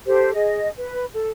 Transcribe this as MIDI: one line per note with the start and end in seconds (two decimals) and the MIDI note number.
0.06 0.32 67
0.06 0.32 69
0.06 0.32 72
0.34 0.69 68
0.34 0.69 75
0.76 1.05 71
1.14 1.30 69